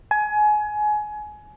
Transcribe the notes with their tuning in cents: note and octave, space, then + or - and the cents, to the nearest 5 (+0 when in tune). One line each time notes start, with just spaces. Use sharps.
G#5 +25